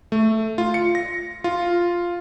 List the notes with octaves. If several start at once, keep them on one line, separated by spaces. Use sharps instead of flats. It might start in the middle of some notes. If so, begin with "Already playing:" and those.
A3
F4
C#7
A#6
F4